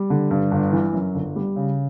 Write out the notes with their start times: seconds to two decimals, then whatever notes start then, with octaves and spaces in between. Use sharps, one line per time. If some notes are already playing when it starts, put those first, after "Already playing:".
Already playing: G3
0.10 D3
0.31 G2
0.51 G1
0.72 E3
0.93 F#2
1.14 G1
1.36 G3
1.56 C#3